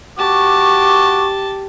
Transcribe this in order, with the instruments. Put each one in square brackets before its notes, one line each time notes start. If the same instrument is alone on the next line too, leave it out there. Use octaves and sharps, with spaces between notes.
[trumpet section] F#4 C#6 D6 [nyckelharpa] G4 A5